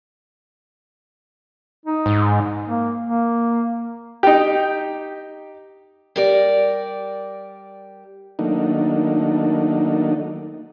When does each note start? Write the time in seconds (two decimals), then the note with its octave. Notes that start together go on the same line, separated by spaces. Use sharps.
1.86 D#4
2.06 G#2
2.67 A#3
3.06 A#3
4.23 D#4 G4
6.16 G3 A#4 D5
8.39 D#3 F#3 A3 A#3 D4 D#4